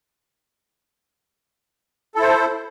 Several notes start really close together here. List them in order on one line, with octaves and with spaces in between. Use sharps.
A4 E4 C5